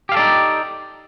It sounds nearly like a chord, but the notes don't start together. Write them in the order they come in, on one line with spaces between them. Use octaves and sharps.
G4 F5 A4 D5 D#4